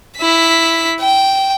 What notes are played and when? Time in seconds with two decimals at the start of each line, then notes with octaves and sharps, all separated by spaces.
0.18 E4 B6
1.00 G5